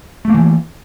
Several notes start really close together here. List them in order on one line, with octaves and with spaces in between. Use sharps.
A3 A#3 E3